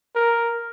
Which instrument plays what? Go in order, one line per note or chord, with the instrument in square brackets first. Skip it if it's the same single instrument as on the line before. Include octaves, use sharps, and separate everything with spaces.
[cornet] A#4